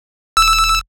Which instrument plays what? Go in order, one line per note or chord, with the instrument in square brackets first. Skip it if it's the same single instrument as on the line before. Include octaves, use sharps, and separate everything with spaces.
[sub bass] E1 [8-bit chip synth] E6